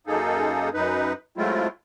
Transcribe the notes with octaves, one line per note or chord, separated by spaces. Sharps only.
F#2 A#3 D#4 G#4 A4
F#2 D#4 B4
F#3 G#3 A3 C4 E4 F4